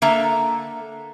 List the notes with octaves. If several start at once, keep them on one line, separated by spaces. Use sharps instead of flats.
D3 A#3 A4 E5 A#5